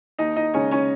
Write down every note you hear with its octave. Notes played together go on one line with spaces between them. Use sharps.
D#2 D#4 D#5
D#4 D#5
C#3 G#3 C#4 C#5
C#4 C#5